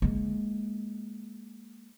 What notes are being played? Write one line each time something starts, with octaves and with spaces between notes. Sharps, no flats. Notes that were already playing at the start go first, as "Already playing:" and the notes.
G#3 A#3